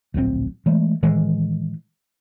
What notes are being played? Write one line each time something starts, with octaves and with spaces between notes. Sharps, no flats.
D1 A#1 C3 C4
E3 G#3 A3
A2 D#3 E3 G#3